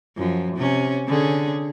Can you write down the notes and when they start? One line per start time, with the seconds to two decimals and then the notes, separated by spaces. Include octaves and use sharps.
0.17 F#2 F3
0.56 C3 C#4
1.07 D3 C#4 G#4